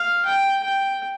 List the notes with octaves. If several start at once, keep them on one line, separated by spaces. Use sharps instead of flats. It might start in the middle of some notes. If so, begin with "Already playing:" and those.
Already playing: F5
G5
G5